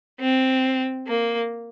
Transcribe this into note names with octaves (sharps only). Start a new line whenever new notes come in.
C4
A#3